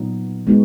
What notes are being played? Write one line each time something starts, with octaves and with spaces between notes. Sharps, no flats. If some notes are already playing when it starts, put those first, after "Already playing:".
Already playing: A#2 F#3 B3 D#4
G#3 B3 D#4 F#4